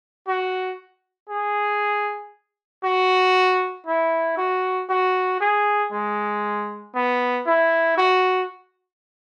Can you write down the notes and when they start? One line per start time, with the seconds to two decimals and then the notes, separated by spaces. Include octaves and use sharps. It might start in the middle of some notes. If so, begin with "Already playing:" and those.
0.27 F#4
1.29 G#4
2.84 F#4
3.87 E4
4.38 F#4
4.90 F#4
5.41 G#4
5.92 G#3
6.95 B3
7.46 E4
7.98 F#4